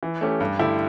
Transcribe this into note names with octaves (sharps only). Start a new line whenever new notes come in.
E3
A3 C#4 G4
G2
D3 A3 E4 G4